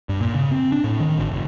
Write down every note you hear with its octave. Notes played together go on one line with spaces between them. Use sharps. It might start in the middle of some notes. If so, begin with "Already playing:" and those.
G2
A#2
C#3
C4
D4
A2
D#3
G#1
F1